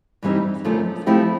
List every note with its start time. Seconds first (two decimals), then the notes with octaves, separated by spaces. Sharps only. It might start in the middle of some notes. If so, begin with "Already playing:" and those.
0.23 G2 E3 G3 C4 D#4
0.65 F#2 D3 F3 A3
1.06 F3 A3 C4 E4 G4